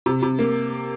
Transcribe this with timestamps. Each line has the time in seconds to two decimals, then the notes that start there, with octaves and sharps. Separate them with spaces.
0.06 C3
0.23 C3
0.39 A#3